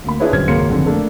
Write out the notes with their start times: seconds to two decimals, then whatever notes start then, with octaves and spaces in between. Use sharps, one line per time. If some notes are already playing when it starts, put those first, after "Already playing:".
0.04 D2 A#3 B5
0.20 D4 E4 F4 G#4 B4 C#5
0.32 G1 F#2 C5 F6 G#6
0.48 G#1 C#2 A#3 C#5 C6 C#7
0.69 F#1 F2 D3 D#3
0.86 A3 A#3 D4 A4